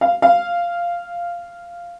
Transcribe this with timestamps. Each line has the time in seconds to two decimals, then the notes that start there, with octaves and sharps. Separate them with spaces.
0.01 F5
0.22 F5